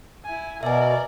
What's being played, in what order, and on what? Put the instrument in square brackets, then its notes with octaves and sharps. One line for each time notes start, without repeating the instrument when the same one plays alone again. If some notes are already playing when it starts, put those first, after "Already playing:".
[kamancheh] E4 G#5
[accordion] B2 [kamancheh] A#4 D5 [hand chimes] E5 G#5